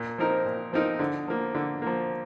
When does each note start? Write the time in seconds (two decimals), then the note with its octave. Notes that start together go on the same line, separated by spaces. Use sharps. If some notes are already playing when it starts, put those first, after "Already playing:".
Already playing: A#2
0.18 F3 C4 D#4 A#4
0.45 A#2
0.72 F3 C4 D#4 A#4
0.99 D3
1.28 F3 A#3
1.55 D3
1.82 F3 A#3